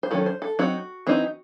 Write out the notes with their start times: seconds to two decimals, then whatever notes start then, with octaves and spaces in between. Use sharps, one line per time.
0.03 C5
0.11 D#3 F#3 C#4 A4
0.26 C5
0.42 A4
0.59 F#3 C4 D#4 F#4
1.07 E3 C4 D#4